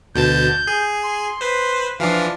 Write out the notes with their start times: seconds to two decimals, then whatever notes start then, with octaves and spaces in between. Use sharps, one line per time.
0.15 D2 B2 A5 G6
0.67 G#4
1.04 C6
1.41 B4 C5
2.00 E3 F3 D4 F5